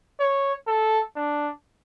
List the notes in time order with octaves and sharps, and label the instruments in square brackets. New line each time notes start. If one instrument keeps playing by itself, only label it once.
[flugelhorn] C#5
A4
D4